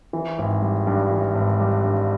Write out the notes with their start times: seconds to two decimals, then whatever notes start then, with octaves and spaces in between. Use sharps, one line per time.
0.13 E3
0.38 G#1
0.62 G3
0.87 G2
1.11 E3
1.35 G#1
1.60 G3
1.84 G2